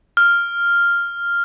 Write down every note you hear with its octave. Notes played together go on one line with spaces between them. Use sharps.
F6